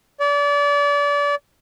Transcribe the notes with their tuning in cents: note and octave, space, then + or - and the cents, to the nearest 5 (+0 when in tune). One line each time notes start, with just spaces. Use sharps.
D5 -30